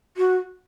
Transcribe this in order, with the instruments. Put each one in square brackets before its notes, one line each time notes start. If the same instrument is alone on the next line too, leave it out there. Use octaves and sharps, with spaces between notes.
[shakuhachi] F#4